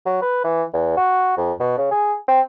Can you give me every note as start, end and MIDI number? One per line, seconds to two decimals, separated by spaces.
0.06 0.21 54
0.22 0.43 71
0.44 0.63 52
0.74 0.96 40
0.97 1.37 66
1.37 1.53 41
1.60 1.74 47
1.78 1.87 49
1.91 2.15 68
2.28 2.41 60